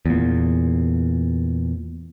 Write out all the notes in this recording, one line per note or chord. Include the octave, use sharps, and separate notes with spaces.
E2 A#2